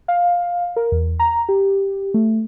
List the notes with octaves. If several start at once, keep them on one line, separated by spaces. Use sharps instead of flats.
F5
A#4
E2
A#5
G4
A3